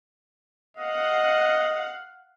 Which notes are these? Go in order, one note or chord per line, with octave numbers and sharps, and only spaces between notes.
D#5 F5 F#5